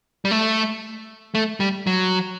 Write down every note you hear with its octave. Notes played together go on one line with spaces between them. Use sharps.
G3
A3
A3
G3
F#3